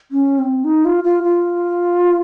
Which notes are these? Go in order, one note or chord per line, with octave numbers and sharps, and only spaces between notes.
C#4
C4
D#4
F4
F4
F4